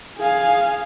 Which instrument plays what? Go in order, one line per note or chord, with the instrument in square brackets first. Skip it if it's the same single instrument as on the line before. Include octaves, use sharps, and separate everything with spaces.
[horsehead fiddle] G#4 F5